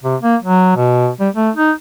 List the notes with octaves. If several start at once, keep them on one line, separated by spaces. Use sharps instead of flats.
C3
A#3
F#3
B2
G3
A3
D#4